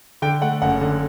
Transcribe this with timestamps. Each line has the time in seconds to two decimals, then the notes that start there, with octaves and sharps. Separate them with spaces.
0.22 D3 G5
0.42 A3 F#5
0.62 F#1 F#5
0.81 D3